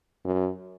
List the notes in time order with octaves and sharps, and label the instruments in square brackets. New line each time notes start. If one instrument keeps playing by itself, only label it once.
[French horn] F#2